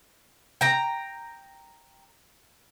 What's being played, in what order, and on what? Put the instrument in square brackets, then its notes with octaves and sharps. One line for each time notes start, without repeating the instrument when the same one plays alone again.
[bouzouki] G5 A#5